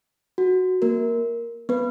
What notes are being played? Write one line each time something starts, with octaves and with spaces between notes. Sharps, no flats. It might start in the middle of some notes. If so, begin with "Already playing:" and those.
F#4
A#3 A#4
B3 B4